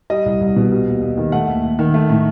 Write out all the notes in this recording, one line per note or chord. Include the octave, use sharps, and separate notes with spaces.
G3 D#5
C2
C2
B2
G3
D#2
D#2
D#3
A3 F#5
D#2
D#2
D#3
A3
A2